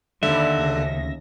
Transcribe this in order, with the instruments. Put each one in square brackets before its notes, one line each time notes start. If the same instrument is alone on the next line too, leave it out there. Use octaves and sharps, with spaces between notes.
[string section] D#2 [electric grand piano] D3 [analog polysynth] D5 B5 A#6 [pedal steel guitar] E5
[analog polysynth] D2 C#3 A#6